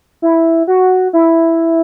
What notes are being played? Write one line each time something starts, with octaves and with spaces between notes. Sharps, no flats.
E4
F#4
E4